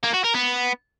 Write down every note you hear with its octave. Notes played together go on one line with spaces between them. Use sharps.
A#3
F#4
A#4
B3